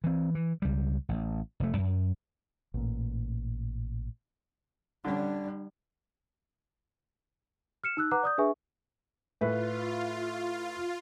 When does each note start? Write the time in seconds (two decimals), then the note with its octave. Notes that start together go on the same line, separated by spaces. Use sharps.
0.04 E3 C4
0.35 E3
0.62 C#2 G3
1.09 A1
1.60 F1 A3
1.78 F#2
2.74 A1 A#2
5.04 D3 G3 C#4 D4
7.84 F6 C#7 E7
7.97 D#4 E6 F#6
8.11 B4 F#5 A#5 D6 F#6
8.23 D5 D#6 G6
8.38 D4 G#4 B4 E5 G#5 C#6
9.41 A2 F4 B4